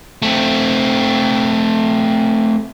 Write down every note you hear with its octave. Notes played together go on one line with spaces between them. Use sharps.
A3 C4